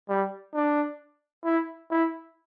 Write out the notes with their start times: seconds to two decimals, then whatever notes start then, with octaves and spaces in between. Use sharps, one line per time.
0.09 G3
0.54 D4
1.45 E4
1.91 E4